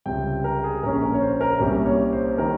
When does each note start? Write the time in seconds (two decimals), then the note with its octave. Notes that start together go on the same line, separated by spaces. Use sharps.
0.06 C#2 C3 G3 G5
0.44 A#4
0.64 G#4
0.83 A#1 A#2 G#3 C#4 A#4
1.02 A#4
1.14 C#5
1.21 C5
1.41 A#4
1.60 C2 C3 G3 A#3 C#4 A#4
1.85 C#5
2.12 C5
2.38 D#3 G3 A#4